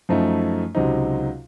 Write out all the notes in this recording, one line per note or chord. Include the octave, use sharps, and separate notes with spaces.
F#2 F3 A3 D#4
C#2 C3 F#3 C4 D#4